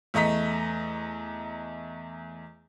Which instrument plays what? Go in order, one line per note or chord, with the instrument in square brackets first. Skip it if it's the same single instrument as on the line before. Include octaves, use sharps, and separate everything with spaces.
[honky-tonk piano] E2 A3 D#5 A#5 B6